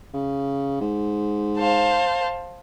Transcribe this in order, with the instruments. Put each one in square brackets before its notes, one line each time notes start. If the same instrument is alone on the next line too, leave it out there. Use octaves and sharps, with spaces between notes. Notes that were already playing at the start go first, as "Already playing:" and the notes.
[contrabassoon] C#3
G#2
[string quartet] C5 F5 A5